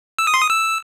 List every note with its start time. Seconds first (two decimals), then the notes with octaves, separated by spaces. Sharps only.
0.19 E6
0.27 D#6
0.34 C6
0.42 D#6
0.50 E6